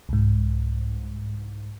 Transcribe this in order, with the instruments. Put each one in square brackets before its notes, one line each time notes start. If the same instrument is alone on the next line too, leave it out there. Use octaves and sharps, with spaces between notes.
[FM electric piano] C2 G#2